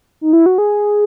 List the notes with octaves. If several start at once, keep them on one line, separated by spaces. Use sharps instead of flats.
D#4
E4
F#4
G#4